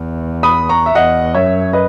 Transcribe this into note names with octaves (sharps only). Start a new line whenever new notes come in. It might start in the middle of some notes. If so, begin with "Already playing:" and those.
Already playing: E2
B5 D#6
A#5 C#6
E5
E2 D#5 F#5
F#2 C#5 E5
B4 D#5